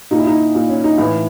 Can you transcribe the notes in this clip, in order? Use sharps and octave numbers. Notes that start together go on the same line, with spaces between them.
A#2 D#4
E4
D#4
A#2
C#4
D#4
A2 E3